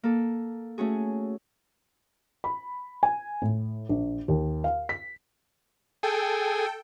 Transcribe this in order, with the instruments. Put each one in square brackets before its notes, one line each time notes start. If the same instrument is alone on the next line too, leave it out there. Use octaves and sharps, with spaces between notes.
[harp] A#3 A4
A3 C#4 F#4 G#4
[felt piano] B5
G#5
A2
A#1
D#2
F5
B6
[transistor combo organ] G#4 [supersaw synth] A4 G5